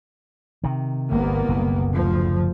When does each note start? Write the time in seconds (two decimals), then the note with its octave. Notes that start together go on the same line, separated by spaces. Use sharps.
0.64 C3 D#3
1.12 G1 C2 A#3 B3
1.49 F#1 B2
1.91 D2 F3